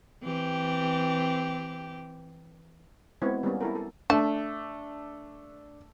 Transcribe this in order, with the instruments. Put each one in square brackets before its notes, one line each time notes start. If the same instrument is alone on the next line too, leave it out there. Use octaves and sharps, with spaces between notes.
[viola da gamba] E3 C4 G4
[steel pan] G#3 B3 C4 E4 C#5
G3 A#3 B3 C#4
E4 A4 A#4
A4
[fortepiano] A3 [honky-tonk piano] D4 [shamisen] A5